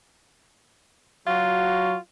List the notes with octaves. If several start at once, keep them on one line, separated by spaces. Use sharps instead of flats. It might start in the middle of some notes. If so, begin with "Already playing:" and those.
F#3 F4 F#4